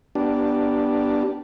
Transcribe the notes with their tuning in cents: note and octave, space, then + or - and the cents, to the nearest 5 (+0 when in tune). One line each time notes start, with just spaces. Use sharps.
B3 -20 D4 +0 G4 -10